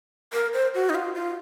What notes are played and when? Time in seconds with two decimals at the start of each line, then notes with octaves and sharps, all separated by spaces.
0.33 A#4
0.53 C5
0.74 F#4
0.90 D#4
0.95 F4
1.15 F4